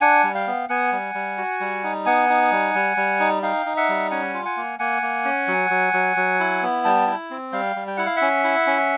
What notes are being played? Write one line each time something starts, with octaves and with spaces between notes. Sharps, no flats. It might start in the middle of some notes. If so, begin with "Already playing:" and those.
D4 F#5 G#5
G3
F5 G5
B3
B3 F#5 G#5
G3
G3
F#4
G3
D#4
B3 F#5 G#5
D#4
G3
G3
G3
D#4
D#4 F5 G5
D#4
E5 F#5
G3
C#4 F#5 G#5
F4
F#5 G#5
A#3
A#3 F#5 G#5
A#3
C#4
F#3
F#3
F#3
F#3
E4
B3
G3 G5 A5
E4
C4
G3 F5 G5
G3
G5
E4 F#5
F5
E5 F#5
C#4
E4
C#4